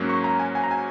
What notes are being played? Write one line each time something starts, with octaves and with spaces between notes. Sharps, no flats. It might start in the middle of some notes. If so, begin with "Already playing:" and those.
Already playing: G#2 F#3 A#3 C#4
C#6
A#5
G#5
G#5
A#5
G#5